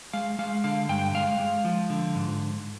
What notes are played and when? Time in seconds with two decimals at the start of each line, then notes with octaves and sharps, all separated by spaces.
0.13 G#3 F5
0.39 G#3 F5
0.64 D3 F5
0.89 G2 G5
1.15 G#3 F5
1.40 G#3
1.65 F3
1.90 D3
2.15 G#2